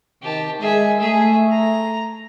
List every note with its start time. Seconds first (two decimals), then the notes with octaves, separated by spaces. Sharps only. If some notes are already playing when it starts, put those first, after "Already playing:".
0.22 C3 D#3 G4 A5
0.60 G#3 G#4 E5
0.99 A3 G#4 E5
1.51 A#5